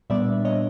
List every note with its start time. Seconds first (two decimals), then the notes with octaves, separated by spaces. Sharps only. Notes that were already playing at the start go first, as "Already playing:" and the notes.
0.10 A#2 G3 B3 D4 D5 E5
0.45 C#5 D#5